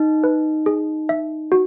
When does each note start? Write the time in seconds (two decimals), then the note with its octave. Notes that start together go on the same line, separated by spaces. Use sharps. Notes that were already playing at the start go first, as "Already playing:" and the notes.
Already playing: D#4
0.24 B4
0.66 G#4
1.09 E5
1.52 F#4